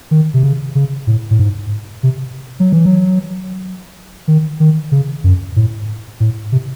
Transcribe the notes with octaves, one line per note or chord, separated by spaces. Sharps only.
D#3
C3
C#3
C#3
A2
A2
G#2
C3
F#3
E3
F#3
D#3
D#3
C#3
F#2
A2
A2
C3